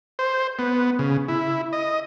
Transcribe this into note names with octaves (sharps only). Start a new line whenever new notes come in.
C5
B3
C#3
E4
D#5